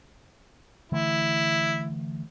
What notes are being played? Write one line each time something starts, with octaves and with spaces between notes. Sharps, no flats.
D3 E3 A3 E4